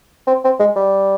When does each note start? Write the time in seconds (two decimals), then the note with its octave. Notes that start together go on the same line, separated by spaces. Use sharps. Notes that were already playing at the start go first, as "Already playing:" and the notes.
0.27 C4
0.44 C4
0.60 G#3
0.76 G3